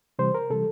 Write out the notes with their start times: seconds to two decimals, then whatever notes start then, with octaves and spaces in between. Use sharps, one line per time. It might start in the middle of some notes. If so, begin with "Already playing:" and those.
0.19 C3 E3 G3 C5
0.35 A#4
0.50 C3 E3 G3 A4